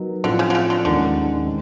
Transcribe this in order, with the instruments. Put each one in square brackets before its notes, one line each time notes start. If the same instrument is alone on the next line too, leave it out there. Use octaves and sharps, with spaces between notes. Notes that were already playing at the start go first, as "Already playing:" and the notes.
Already playing: [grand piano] F#3 B3 D#4 F#4 A#4
[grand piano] A2 F3 A3 C4 F4 [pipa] D3
[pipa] C#3
D3
C#3
D3
[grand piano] D#2 D#3 G#3 C#4 [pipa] D3
[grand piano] G#3 C4